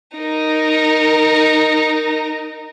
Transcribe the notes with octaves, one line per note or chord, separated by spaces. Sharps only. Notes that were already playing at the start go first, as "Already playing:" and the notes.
D#4 A#4